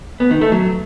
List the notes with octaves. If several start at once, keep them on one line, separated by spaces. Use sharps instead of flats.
B3
D#3
A3
F#3